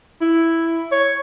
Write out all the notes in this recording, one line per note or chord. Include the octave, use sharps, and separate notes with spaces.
E4
C#5